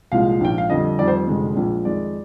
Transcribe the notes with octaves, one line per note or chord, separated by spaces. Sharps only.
C2 A#2 F3 G#3 F5
A#1 G#2 F3 G5
F5
F2 D3 G3 D#5
F2 D#3 G3 D5
C5
F1 F2 D3 G#3
A#1 A#2 G#3
F2 D#3 G#3 D5